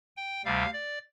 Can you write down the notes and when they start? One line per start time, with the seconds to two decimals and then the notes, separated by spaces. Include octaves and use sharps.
0.16 G5
0.45 D2 C3 G3 F5
0.73 D5